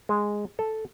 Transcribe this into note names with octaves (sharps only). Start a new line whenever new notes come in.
G#3
A4